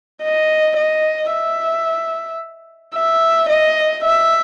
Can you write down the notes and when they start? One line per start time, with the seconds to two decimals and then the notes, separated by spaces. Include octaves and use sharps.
0.23 D#5
0.77 D#5
1.32 E5
2.95 E5
3.49 D#5
4.04 E5